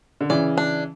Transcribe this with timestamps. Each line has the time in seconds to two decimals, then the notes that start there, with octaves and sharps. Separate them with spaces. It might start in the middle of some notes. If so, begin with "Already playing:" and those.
0.21 D3
0.30 C#3 E3 D5
0.58 D4